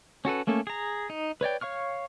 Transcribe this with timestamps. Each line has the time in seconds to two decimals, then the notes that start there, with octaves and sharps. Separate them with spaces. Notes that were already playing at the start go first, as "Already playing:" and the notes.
0.25 C#4 F#4 A4 B4
0.47 A3 A#3 C#4 A4
0.67 G#4 A#5
1.10 D#4
1.41 B4 C#5 D5 G5
1.61 C#5 F5 C#6 F6